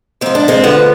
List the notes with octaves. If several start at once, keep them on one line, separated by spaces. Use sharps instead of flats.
G#2 F3 C4
D4
G#3 C4
D2 D3 F3 B3